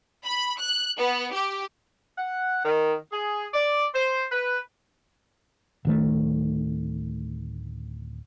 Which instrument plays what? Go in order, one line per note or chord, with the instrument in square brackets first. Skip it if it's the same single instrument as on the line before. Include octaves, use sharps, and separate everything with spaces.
[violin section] B5
F#6
B3
G4
[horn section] F#5
D#3
G#4
D5
C5
B4
[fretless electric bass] D1 D#3 A3